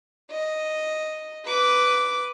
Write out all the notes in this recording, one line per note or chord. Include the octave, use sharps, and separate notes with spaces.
D#5
B4 D6